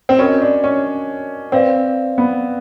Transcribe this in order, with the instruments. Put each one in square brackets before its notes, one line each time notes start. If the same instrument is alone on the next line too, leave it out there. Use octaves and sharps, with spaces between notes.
[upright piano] C4
[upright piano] C#4 [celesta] F#4 A#4 D#5
[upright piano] D4
C#4
[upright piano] C4 [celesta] B4 D5 F5
[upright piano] B3